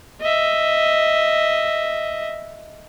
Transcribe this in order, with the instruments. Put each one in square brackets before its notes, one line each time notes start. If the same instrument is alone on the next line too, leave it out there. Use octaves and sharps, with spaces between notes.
[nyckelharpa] D#5 E5